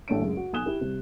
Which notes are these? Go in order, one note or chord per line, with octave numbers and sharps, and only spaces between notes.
A1 A3 D4 C#5 D7
F#2 C#3 G#3
F#4
B1 G#5 D#6 F#6 E7 G7
E4 G4
C3 G3